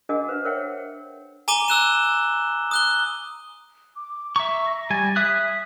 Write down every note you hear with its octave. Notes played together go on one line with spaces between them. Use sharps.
D4 F#4 G#4 A#4 D#5 F#5
B4 C5 F5
A#4 C5 C#5 E5 F#5 G5
G#5 A#5 D6 D#7 G7
E6 F#6 E7
D#6 F#6 G7
D6
E5 A#5 C#6
A#6
G3 G#5 A6
E5 D#6 F#6 B6